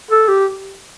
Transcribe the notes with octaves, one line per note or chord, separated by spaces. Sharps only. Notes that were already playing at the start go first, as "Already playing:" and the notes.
A4
G4